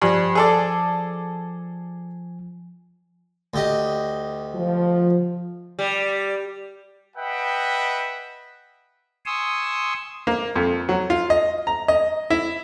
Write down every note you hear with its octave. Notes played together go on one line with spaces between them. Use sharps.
G2 F3 G#5
G#4 A4 D5
D2 G4 D#5
F3
G3
B4 D#5 E5 F#5 G5
G#5 C6 C#6 D#6 E6
A#3
F2
F#3
F4
D#5
A#5
D#5
E4